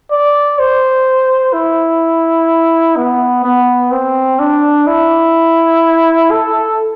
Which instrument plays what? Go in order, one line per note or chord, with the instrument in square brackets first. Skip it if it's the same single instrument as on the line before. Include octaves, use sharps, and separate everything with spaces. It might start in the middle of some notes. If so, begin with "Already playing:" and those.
[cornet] D5
C5
E4
B3
B3
C4
D4
E4
A4